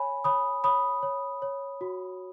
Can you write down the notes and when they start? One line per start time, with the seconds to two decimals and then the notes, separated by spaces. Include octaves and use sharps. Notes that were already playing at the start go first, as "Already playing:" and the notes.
Already playing: C#5 G#5 B5
0.24 C#5 B5 D#6
0.64 C#5 B5 D#6
1.03 C#5
1.42 C#5
1.81 F#4